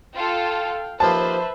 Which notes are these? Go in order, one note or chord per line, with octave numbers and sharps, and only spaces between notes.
F4 A4 F5 G5
D#2 F3 A#3 B4 C5 E5 A5